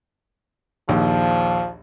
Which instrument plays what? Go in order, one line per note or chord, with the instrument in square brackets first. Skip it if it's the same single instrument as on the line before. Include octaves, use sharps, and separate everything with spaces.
[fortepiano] A#1 D#2 [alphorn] F3